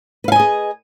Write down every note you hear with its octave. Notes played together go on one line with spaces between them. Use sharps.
G#4 B4 D#5 F5 G#5